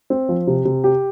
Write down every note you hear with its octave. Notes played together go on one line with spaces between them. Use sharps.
C4
F3
C3
C3
G4